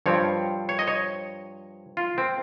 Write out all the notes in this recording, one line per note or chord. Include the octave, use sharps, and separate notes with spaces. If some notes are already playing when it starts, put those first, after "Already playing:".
G2 F3 C4 C#5
C#5
D#5
C#5
F4
C4